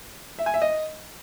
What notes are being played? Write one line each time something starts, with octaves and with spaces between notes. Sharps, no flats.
E5
G#5
E5
D#5